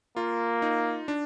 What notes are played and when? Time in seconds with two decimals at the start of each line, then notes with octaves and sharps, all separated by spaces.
0.16 A#3 F4
0.62 D#4
1.08 D4